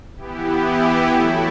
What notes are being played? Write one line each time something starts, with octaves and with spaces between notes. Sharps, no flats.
E3 B3 E4 G4
F#3 A3 E4 A4